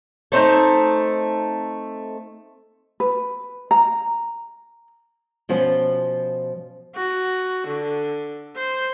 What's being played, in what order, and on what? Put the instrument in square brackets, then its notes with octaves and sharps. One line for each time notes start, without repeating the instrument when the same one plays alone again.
[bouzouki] A3 C4 D#4
[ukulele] B4
A#5
[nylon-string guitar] B2 F3 C#4 C5
[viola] F#4
D3
C5